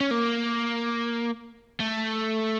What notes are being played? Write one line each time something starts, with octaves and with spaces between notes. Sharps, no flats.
C#4
A#3
A3